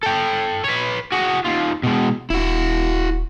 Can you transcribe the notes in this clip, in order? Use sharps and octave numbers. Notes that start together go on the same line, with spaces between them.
A4 G5
B4 C#5
F#4 G#4
D#2 F4
B2 G#3
D#1 E4 F#4